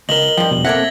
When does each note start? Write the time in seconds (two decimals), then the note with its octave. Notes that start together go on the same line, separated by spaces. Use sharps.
0.09 C#2 A#4 D#5 F#7 G7
0.37 G2 F3 G5
0.51 E2 B2
0.65 A#3 C4 A4 A#4 E5 F#5 G#6 A#6